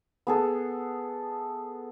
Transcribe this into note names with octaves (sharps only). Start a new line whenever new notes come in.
B3 G#4 A4